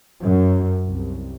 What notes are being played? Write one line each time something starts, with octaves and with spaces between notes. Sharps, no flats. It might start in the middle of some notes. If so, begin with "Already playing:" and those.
F#2
C2